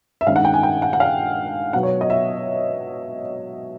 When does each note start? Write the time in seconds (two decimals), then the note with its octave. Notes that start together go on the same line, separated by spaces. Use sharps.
0.21 E5
0.26 G2 D#3 G#3 C#4 F5
0.36 F#5
0.45 G5
0.54 G#5
0.63 G5
0.82 F#5
0.93 F#5
1.00 F5
1.73 B2 F#3 B3 F#5
1.83 C#5
2.01 D#5
2.10 E5